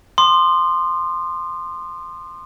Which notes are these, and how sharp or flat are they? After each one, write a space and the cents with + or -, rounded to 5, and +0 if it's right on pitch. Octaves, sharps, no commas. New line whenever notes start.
C6 +0 D#6 -40